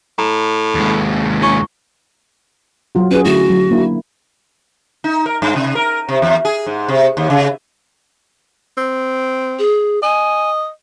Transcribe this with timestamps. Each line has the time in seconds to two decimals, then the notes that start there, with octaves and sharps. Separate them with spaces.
0.18 A2 A#5
0.75 D#2 G#3
1.42 C#4 E4 C#6
2.95 F#3 F4 F#4
3.11 C#4 F#4 G#4 B4
3.25 D3 A3 E4 F#4
3.50 F#3
3.71 A#3 D4 E4
5.04 D#4
5.26 A#4
5.42 G2
5.56 C3
5.75 A#4
6.09 C3
6.22 E2
6.45 G#4
6.66 G#2
6.88 C3
7.17 D#2
7.30 C#3
8.78 C4
9.59 G#4
10.03 D#5 G#5